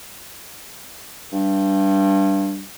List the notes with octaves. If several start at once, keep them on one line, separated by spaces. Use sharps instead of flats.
G2